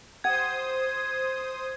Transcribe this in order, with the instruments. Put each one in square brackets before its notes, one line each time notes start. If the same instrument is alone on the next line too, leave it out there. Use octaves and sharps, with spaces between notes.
[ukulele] G4 F#5 [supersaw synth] C5 D#6 [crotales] G#6